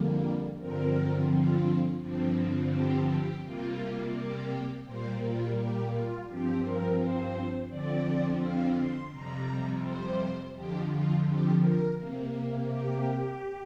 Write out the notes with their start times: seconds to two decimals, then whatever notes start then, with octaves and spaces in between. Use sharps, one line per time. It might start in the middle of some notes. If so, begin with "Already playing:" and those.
Already playing: F2 D3 G3 A#3
0.59 G2 D3 F3 C4 A#4
1.30 F4
2.01 G2 D3 F3 C4
2.72 G4
3.08 G4
3.43 C3 G3 A#3 F4
4.14 G4
4.85 A#2 G3 A#3 C5
5.21 F4
5.56 G4
5.91 F4
6.27 G2 F3 C4 G4
6.62 A#4
6.98 C5
7.69 F2 D3 F3 C4 D5
8.41 F5
8.76 C6
9.11 F2 C3 G3 A#5
9.83 C5
10.54 F2 D3 F3 G4
10.89 F4
11.25 G4
11.60 A#4
11.96 C3 A#3
12.67 G4